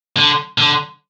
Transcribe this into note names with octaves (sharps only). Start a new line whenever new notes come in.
D3
D3